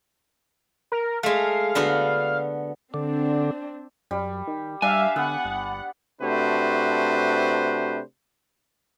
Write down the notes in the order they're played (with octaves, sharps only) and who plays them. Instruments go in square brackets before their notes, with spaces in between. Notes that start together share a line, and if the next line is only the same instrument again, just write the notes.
[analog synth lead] A#4
[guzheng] G#3 A3 [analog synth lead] F5
[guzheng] D3 B3 F#4
[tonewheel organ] D3 [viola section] C4 D4
[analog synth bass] F#2 [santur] G3
[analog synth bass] D#3
[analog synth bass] G3 [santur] D4 [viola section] E5 F5 [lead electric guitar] G#5
[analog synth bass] D3 [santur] B3 [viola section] F#5
[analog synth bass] G1
[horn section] C3 A3 D4 F#4 B4 C5